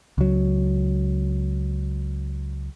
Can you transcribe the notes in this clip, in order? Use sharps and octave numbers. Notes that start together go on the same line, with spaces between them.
C#2 F#3